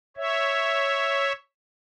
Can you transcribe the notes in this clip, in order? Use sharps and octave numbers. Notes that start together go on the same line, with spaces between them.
C#5 E5